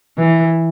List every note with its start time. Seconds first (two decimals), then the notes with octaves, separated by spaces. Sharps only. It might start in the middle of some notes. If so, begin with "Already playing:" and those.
0.18 E3